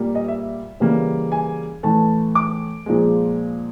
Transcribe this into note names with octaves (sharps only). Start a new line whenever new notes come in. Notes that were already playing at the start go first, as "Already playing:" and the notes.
Already playing: A#2 G3 A#3
D#5
E5
C#3 E3 G3 A#3
G#5
A2 E3 A3 A5
D6
A#2 F3 G#3